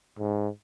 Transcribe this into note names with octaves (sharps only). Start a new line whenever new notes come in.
G#2